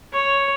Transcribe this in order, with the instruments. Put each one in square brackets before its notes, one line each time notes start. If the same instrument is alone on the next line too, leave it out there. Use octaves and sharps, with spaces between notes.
[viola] C#5